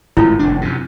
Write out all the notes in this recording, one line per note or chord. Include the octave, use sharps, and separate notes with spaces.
G#1 A2 E4 F4
F1 D4
F#2 C3